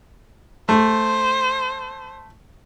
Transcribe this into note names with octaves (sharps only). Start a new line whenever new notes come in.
A3 C5